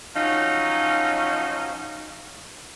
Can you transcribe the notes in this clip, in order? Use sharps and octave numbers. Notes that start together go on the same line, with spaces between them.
F3 F#3 C#4 D#4